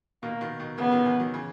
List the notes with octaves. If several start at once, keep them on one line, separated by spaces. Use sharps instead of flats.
B2 D#3 A#3
B2 D#3
B2 D#3
C#3 E3 B3
D#3 F#3
C#3 E3
D#3 F#3
C#3 E3